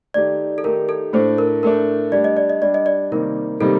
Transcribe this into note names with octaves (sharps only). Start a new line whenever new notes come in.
D#3 A3 D#4 G4 D5
A4
D#3 A3 D#4 G4 A#4
A4
A2 A3 D4 C5
A#4
A2 A3 D4 A#4
G3 D4 G4 D5
D#5
D5
D#5
G3 D4 G4 D5
D#5
D5
C3 D#3 G3 A#3 D#4 A#4
C3 D#3 G3 A#3 D#4 A4